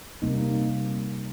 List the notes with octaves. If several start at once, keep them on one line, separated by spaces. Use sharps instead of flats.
C3 G3 A#3 D#4